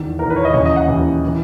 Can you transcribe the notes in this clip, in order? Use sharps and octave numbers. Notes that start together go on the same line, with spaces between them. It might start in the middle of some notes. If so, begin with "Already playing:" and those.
Already playing: E2 D#3
E2 D#3 A#4
B4
C#5
D#5
D#2 C#3 E3 C#5
D#5
F#5
D#2 C#3 E3
E3